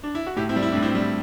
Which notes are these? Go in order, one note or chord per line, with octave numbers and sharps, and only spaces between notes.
D4
E4
F#4
A2 E4 G4
C4 E4
G3
E4
A2 D4
C4 E4
G3